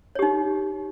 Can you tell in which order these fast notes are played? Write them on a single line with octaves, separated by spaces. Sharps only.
C#5 G4 D#4